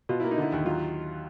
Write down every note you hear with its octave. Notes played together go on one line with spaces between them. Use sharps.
B2 F4
A#3 E4
D#4
D3 E4
D#2
F#3 F4